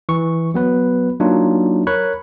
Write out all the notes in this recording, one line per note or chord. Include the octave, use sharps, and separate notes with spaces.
E3 C#6
F#3 B3 B4
F#3 A#3 D4 D#4 F4
A#4 C#5 B5 C#6 F#6